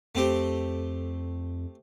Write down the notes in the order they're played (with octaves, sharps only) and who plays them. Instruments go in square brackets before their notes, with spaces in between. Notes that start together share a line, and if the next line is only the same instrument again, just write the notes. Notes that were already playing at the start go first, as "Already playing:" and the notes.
[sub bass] F2 [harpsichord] A3 C4 G4